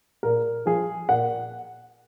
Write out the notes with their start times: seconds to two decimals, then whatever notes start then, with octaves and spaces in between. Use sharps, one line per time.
0.23 A#2 A#4
0.66 F3 G#4
1.09 A#2 F#5